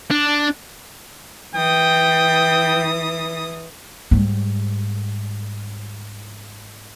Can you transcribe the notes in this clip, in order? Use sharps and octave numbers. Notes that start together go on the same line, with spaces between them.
D4
E3 G5 D#6
G#2 G3